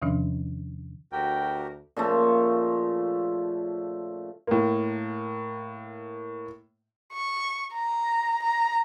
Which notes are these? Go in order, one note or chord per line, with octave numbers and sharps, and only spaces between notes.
E2 C3 D#3 F3 C#4 D4
D2 F#4 G4 A#4 G5
A#2 C#3 F3 A3
A2 A#3
C#6
A#5
A#5